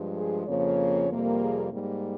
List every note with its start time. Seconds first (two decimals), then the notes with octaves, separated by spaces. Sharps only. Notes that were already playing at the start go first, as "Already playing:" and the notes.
Already playing: G2 F3 G#3
0.16 G#4
0.47 F2 C#3 F3 A#3 C#5
1.10 F2 C3 G3 A#3
1.41 G#4
1.72 G#2 G3 A#3